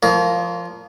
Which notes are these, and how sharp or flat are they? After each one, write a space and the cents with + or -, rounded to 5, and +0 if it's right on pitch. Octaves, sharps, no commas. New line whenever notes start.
F3 +0 A#4 +0 C#5 +45